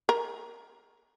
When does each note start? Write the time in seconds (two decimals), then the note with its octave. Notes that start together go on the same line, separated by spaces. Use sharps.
0.09 A#4